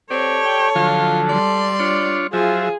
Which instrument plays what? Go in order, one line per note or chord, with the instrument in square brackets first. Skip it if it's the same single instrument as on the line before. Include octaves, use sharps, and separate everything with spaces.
[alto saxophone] C4 [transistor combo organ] G4 D5 [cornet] A4 [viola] C#5
[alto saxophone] G5
[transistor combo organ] D3 F3 F#3 [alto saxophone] F4
[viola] G3 C6 [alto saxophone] D5
[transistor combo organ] D4 F4 C#5
[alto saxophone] F3 [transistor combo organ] F#3 E5 [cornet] F4 [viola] G#4